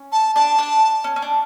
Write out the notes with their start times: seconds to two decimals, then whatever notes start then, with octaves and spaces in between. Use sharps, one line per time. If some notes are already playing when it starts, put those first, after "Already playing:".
Already playing: C#4
0.12 A5
0.36 D4 A5
0.58 D4
1.04 C#4
1.16 C#4
1.22 D4